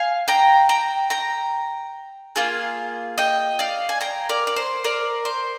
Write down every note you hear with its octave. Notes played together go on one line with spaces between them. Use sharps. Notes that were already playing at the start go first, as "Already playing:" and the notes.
Already playing: F5 G#5
G5 A#5
G5 A#5
G5 A#5
A#3 F4 G#4
D#5 G5
D5 F5
G#5
G5 A#5
A#4 D5
D5
C5
A#4 D5
C5